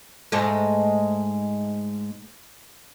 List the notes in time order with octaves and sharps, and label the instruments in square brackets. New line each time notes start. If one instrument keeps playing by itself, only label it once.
[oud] G#2 G#3 A3